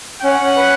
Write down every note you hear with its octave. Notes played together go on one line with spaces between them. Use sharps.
C#4 F#5
B4